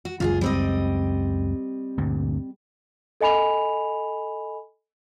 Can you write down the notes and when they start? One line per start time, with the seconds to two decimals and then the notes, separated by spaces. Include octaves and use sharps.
0.05 F#4
0.20 F#1 C#2 F#2 F4 F#4 G#4
0.41 G3 C4 D#5
1.98 D2 G2 A#2
3.21 A4 D#5 G#5 B5 F7